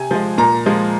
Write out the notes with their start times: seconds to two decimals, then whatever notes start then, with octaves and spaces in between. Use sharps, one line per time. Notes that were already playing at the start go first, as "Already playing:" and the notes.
Already playing: C3 G#5
0.11 F3 G#3
0.38 A#2 A#5
0.66 F3 G#3